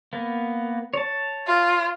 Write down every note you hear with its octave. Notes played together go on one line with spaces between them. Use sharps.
A#3 B3
C#5 A5
F4